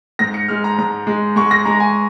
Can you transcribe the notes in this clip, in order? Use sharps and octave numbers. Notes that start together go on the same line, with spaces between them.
G#2 A#6
C#7
G#3 F6
A#5
G#2 A#5
G#3
G#3 C#6
A#6
G#3 A#5
G#5